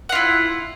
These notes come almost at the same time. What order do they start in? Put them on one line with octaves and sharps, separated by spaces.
F#5 F4 E4